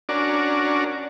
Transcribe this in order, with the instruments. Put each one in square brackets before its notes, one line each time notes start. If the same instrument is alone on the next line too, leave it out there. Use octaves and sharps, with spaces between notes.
[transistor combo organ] C#4 D4 F#4 A#4 D5